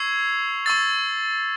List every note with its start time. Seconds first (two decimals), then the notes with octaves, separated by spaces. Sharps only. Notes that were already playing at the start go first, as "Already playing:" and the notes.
Already playing: C#6 E6 G#6 C7 F7
0.66 C#6 E6 A6